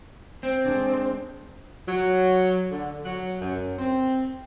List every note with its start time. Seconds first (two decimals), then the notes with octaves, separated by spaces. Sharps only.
0.43 C4
0.65 G#3 D4
1.87 F#3
2.70 D3
3.04 F#3
3.40 F#2
3.77 C4